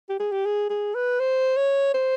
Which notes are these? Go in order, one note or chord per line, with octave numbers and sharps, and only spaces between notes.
G4
G#4
G4
G#4
G#4
B4
C5
C#5
C5